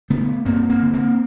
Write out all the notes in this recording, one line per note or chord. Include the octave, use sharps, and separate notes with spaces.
D3 A3 B3
G2 A#3 C4
A#3 C4
D3
A#3 C4